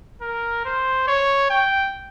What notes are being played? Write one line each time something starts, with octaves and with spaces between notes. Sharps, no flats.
A#4
C5
C#5
G5